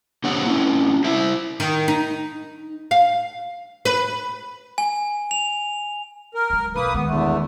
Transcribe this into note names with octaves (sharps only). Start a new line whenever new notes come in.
D3 A#3 C4 G4 C#5 F#5
C4 C#4 E4
E4 C5 E5
D#3
D#4
F5
B4
G#5
F7
A#4
F#3 G#3
B1 A#3 B4 D#6
D#3 G#3 B3
E2 D3 A3